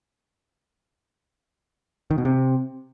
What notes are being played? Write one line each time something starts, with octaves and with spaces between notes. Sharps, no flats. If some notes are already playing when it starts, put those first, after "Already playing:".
D#3
B2
C3